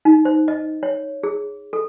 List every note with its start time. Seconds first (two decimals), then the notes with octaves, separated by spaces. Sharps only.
0.05 D#4
0.25 C5
0.48 D#5
0.83 C#5
1.23 G#4
1.73 A4